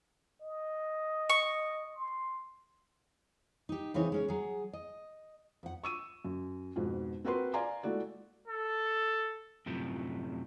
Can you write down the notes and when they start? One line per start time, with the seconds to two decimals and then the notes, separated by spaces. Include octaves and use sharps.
0.42 D#5
1.29 C#6
1.95 C6
3.69 D#4 G4
3.94 C#3 E3 C4 D#4 C#5
4.12 G#3 C#4 C#5
4.28 F#3 G#4
4.73 D#5
5.63 F2 F#5
5.84 C#6 E6 D#7
6.25 F#2
6.76 F2 G#2 B2
7.24 C4 F#4 A#4 B4 C6
7.53 D5 F5 G#5 A#5 C6
7.83 G#3 A3 E4 F#4 D5
8.47 A4
9.66 F#2 A2 C3 F3